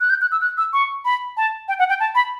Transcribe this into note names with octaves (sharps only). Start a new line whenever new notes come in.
F#6
G6
F#6
E6
F#6
E6
C#6
B5
A5
G5
F#5
G5
A5
B5